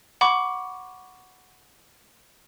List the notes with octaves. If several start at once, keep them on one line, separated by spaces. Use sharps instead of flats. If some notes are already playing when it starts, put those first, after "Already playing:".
F#5 B5 C#6 D6